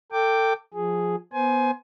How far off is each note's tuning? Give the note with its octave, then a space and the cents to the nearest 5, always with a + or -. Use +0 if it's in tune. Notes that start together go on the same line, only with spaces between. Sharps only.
A4 +30 G5 +0 D6 +0
F3 +15 G#4 +0
B3 +0 C5 +0 G#5 +20